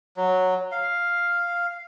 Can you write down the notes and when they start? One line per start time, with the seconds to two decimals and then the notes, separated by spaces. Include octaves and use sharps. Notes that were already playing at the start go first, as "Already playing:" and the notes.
0.17 F#3
0.72 F5